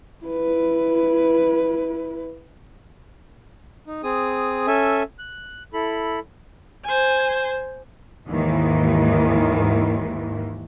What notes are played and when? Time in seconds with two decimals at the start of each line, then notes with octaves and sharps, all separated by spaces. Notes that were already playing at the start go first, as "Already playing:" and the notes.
0.25 E4 B4
3.87 D#4
4.03 C4 G#4 D#6
4.67 C#4 A4 E5 G#5
5.19 F#6
5.73 E4 A4 B5
6.85 C5 G#5
8.30 D#2 G#2 D#3 E3